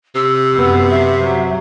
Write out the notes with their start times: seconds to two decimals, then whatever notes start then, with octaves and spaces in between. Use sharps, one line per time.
0.15 C3 E6
0.54 F#2 B3
0.89 E5
1.21 F#3